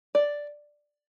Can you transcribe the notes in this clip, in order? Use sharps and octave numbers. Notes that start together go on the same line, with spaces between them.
D5